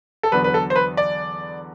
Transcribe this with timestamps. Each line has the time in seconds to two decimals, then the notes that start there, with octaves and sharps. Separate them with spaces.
0.23 A4
0.31 E2 D3 F#3 B3 D4 B4
0.44 B4
0.54 A4
0.70 C5
0.76 B4
0.97 D5